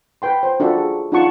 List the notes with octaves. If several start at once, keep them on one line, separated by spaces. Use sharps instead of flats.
B4 G5 C6
C5
D4 F4 F#4 A4 E5
G#4
D4 D#4 F4 F#5 A5 C#6